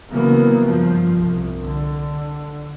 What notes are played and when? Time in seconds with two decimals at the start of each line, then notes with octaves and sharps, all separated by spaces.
0.10 C#3 E3 F#3 A#3 B3
0.65 G2 F3
1.20 C2
1.61 D3